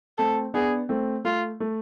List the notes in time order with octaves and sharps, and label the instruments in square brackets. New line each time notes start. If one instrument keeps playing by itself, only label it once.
[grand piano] A3 C4 [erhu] A4
[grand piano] B3 D4 [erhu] G#4
[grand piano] A3 C4
[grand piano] A3 [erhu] F4
[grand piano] A3